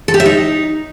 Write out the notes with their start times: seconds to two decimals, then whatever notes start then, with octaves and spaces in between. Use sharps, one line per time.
0.08 A4
0.14 G4
0.20 E5
0.26 D#4